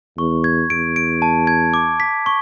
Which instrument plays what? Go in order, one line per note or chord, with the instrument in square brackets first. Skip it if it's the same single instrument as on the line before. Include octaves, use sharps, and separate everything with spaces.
[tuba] E2 [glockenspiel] C#6
[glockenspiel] G#6
[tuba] E2 [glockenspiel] D7
[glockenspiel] D7
A5
G#6
D6
B6
C#6